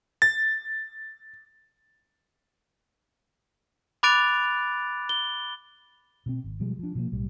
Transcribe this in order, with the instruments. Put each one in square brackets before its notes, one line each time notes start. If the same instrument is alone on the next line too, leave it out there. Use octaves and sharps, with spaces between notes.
[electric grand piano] A6
[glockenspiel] B5 D6 F#6 A6 D7 F7
G7
[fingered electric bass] B2 B3 C4
G#1
B2 F3 G3 G#3
F3 D4
B2 F3 A#3
B1 A2 G3